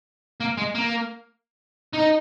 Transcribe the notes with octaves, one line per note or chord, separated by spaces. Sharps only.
A#3
G#3
A#3
D#4